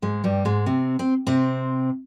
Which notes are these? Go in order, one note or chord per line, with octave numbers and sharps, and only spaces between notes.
G#2 G#3
G2 G3
G#2 G#3
C3 C4
C4
C3 C4